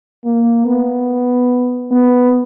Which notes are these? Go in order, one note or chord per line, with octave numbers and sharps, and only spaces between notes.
A#3
B3
B3